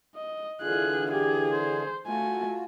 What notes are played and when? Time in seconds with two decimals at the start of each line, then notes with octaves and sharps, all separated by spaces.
0.15 D#5
0.62 D3 E3 D4 F4 G#4 F#6
1.12 G4 G#4
1.53 C5
2.07 A3 F4 F#4 G#5